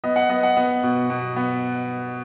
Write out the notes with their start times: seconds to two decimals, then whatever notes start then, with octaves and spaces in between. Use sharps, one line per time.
0.04 B3 D#5
0.16 F#5
0.29 B3 D#5
0.43 F#5
0.57 B3
0.83 B2
1.10 B2
1.36 B3